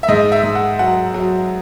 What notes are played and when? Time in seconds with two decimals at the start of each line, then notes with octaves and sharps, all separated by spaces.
0.03 E5
0.08 G#2 D#5
0.32 E5
0.43 G#2
0.55 F#5
0.79 F#3 F#5
1.14 F#3